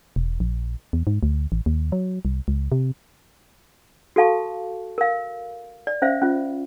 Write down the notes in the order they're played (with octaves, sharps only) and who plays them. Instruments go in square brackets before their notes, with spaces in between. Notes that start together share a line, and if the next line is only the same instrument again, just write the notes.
[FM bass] E1
A#1
E2
G#2
D2
A1
D#2
F#3
C2
C#2
C3
[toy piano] F#4 A4 F5 A5 C#6
A#4 F5
D5
C#4 C5 E5 F5
C#4 F4